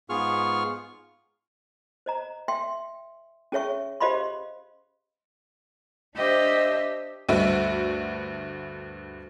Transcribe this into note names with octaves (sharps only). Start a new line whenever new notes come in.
G#2 B3 F4 G#4 C#6 F6
C5 D#5 A#5
E5 G5 C6
C#4 G#4 C#5 E5 C#6
G4 C5 D#5 F5 B5 C6
D4 G4 C5 D#5 E5
D2 G2 A3 F#4 E5